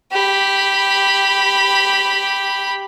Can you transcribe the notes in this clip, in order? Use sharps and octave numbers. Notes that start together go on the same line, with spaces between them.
G4 B5